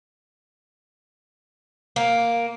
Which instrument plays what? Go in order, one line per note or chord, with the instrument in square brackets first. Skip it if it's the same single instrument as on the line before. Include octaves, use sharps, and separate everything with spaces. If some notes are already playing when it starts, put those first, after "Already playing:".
[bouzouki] A#3